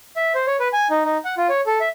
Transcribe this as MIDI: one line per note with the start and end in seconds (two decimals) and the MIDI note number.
0.16 0.33 76
0.35 0.46 72
0.47 0.57 73
0.60 0.68 71
0.73 0.88 80
0.90 1.05 63
1.05 1.18 63
1.25 1.35 78
1.37 1.48 65
1.49 1.61 73
1.66 1.79 69
1.80 1.89 76